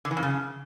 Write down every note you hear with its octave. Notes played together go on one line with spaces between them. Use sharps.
D3
E3
F2
C#3